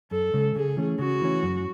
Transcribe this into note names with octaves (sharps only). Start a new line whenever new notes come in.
F#2 A4
C#3 G#3
C#3 G#4
E3 A3 C#4
C#3 F#4
E3 A3 C#4
F#2